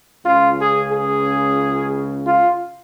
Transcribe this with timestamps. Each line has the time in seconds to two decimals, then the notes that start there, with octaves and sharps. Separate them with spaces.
0.25 C#2 C#3 F4
0.59 G#4
0.92 G#4
2.27 F4